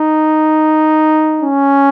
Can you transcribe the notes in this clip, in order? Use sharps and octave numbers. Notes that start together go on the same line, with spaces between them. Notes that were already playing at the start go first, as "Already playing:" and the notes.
Already playing: D#4
C#4